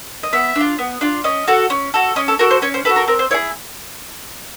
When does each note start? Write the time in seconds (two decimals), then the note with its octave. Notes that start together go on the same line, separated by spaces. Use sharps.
0.23 D#5
0.33 B3 E5
0.56 D4 F4
0.79 B3
1.01 D4 F4
1.24 C#4 D#5
1.48 F#4 A4
1.70 C#4
1.94 F#4 A4
2.16 C#4 D#5
2.28 A4
2.39 F#4 A4 A#4
2.51 C5
2.62 C#4 C#5
2.74 C5
2.85 F#4 A4 B4
2.96 A#4
3.08 C4 A#4
3.19 C5
3.31 E4 G#4 C#5